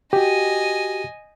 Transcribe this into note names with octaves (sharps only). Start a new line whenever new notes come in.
F#4 G4 D#5 G#5